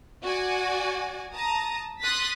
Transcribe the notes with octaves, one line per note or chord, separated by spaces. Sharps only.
F#4 D5 G#5
A5 A#5 D#6
C6 D#6 F#6 A6 B6